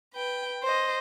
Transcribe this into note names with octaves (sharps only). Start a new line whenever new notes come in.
B4 G5
C5 D#5